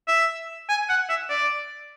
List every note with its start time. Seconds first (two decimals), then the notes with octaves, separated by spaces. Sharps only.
0.08 E5
0.69 G#5
0.89 F#5
1.09 E5
1.30 D5